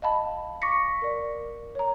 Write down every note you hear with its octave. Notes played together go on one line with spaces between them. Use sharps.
D#5 F5 A5 B5
C#6 D6 A#6 B6 C#7
A#4 D5
C#5 A#5